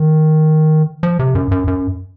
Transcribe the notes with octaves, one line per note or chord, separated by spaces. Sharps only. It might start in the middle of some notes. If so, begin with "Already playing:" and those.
Already playing: D#3
F3
C3
F#2
F#2
F#2